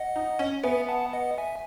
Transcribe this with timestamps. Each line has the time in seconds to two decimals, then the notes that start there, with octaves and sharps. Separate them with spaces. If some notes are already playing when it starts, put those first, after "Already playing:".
Already playing: D#5 F#5
0.16 D#4
0.39 C#4
0.64 B3 E5 G#5
0.89 F#5 A5
1.13 D#5 F#5
1.38 E5 G#5